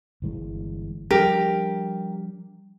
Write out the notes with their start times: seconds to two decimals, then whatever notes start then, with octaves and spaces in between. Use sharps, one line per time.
0.22 G1 E3 G#3
1.11 F3 G3 D4 G4 A#4